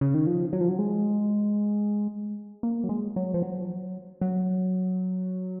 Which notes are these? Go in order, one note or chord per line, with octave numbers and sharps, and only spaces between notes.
C#3
D#3
F3
F#3
F3
F#3
G#3
A#3
F#3
G#3
F#3
F3
F#3
F#3